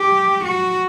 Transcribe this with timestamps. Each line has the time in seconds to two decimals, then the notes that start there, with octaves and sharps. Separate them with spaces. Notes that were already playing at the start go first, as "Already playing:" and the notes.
Already playing: G4
0.45 F#4